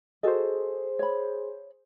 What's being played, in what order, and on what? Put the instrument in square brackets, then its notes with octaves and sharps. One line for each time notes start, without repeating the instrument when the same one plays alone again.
[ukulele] F#4 A4 D#5 [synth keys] G#4 C5
[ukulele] C#5 B5